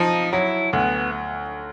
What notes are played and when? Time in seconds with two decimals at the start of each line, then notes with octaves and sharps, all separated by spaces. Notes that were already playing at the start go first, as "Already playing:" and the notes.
Already playing: F3 D#4
0.33 F#3 E4
0.73 D2 B3